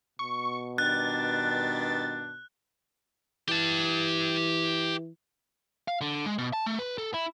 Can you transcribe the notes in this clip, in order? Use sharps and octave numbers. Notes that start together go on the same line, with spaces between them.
B2 C#6
G2 D#3 D4 F#6 A6
E3 G4 A5
F5
D3
G#3
B2
A5
A3
B4
A4
E4